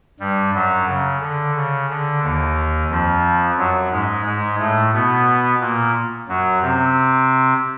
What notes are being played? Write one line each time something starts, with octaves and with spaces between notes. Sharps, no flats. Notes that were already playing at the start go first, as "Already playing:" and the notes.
G2 G3
F#2 F#3
C#3
D3
C#3
D3
D#2 D#3
F2 F3
F#2 F#3
G#2 G#3
G#2 G#3
A2 A3
B2 B3
A#2 A#3
F#2 F#3
C3 C4